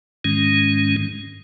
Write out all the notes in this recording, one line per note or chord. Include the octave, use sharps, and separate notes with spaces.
G#2 D#3 G#3 C#4